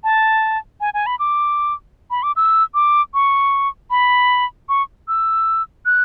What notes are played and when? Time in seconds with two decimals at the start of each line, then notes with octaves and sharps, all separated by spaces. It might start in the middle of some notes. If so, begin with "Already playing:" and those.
0.04 A5
0.81 G#5
0.94 G#5
1.06 B5
1.19 D6
2.11 B5
2.23 D6
2.36 E6
2.74 D6
3.14 C#6
3.91 B5
4.69 C#6
5.08 E6
5.86 F#6